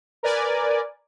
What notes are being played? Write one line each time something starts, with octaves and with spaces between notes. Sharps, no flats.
A#4 B4 D5 G#5